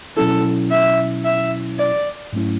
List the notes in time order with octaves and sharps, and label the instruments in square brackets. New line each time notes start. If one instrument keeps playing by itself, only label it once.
[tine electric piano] B2 F#3 C#4 E4 [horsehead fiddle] A4
[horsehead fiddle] E5
E5
D5
[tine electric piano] G#2 F#3 A3 C#4 E4